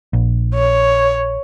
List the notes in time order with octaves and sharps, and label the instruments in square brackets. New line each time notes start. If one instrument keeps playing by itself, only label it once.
[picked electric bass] A#1
[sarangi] C#5